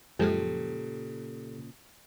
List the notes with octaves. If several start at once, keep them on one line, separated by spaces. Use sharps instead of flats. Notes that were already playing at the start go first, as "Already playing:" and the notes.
F#2 A#2 C#3 F3 G#3 G4 A4